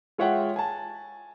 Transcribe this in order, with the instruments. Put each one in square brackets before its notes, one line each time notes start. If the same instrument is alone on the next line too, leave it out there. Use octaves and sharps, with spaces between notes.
[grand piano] G#3 F4 C#5 E5 F#5 G5
G#5 A5